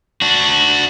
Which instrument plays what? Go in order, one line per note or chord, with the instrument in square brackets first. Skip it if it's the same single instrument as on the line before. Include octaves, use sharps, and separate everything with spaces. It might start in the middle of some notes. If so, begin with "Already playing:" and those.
[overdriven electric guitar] D4 F#4